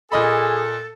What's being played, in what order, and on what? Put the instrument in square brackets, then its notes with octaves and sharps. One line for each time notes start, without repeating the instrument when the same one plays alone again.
[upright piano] A#2 D#5 B5 [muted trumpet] G#4 [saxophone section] A4